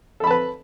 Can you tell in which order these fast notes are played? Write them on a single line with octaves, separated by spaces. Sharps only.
A4 B5 A5 B4